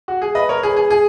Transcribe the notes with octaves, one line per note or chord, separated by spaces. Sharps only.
F#4
G#4
B4 D#5
A#4 C#5
G#4 B4
G#4
G#4